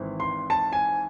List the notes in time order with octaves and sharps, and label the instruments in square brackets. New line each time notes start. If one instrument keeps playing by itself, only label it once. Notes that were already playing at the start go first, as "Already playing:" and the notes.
Already playing: [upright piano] G#1 G#2 E3 C4
[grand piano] C6
A5
G#5